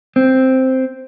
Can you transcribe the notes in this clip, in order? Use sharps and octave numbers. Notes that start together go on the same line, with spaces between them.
C4